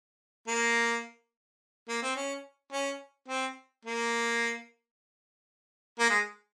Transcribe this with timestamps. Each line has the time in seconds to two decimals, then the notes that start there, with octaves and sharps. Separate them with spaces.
0.47 A#3
1.89 A#3
2.02 C4
2.16 C#4
2.73 C#4
3.28 C4
3.85 A#3
5.99 A#3
6.10 G#3